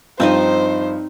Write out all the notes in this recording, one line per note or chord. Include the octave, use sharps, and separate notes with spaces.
G2 F3 C4 D#4 C5 D#5